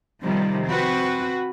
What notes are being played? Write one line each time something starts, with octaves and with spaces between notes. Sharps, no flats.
C3 D#3 F3 G3
C4 F#4 B4